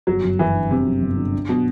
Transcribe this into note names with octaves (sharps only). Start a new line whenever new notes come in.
G1 F#3
F#2
G1 E3
D3
G1 C3
F#2
G1
D3
D4
B2 F#3